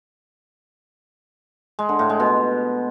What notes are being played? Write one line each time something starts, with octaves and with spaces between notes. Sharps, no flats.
G#3
D3
A2
G#3
B2